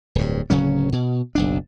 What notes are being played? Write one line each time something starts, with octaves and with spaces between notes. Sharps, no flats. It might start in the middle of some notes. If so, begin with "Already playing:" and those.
D1 G2
D1 C#3 F#3 C#4
B2
F#1 B1 D4